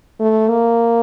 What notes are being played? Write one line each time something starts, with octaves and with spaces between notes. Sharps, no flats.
A3
A#3